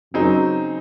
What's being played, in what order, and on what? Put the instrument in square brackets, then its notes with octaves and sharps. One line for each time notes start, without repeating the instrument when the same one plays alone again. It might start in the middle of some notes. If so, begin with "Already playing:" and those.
[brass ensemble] F#2 [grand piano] C#3 F#3 C4 D#4 G#4